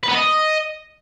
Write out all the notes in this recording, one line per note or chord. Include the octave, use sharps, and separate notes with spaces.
B4
B3
D#5